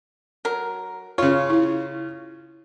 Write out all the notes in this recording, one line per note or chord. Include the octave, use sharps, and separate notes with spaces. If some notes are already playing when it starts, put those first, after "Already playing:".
F#3 A#4
C#3 F4 C#5
E4